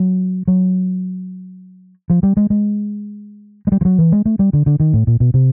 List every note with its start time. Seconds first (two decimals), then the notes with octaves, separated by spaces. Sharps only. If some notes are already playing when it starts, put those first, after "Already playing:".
Already playing: F#3
0.48 F#3
2.10 F3
2.23 G3
2.37 G#3
2.50 G#3
3.67 G#3
3.72 G3
3.81 F3
3.85 F#3
3.99 E3
4.12 G#3
4.26 A3
4.39 G3
4.53 D3
4.66 D3
4.80 D#3
4.93 A2
5.07 A#2
5.20 B2
5.34 C3